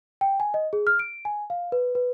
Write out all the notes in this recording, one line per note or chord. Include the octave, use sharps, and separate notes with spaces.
G5
G#5
D#5
G#4
F6
D7
G#5
F5
B4
B4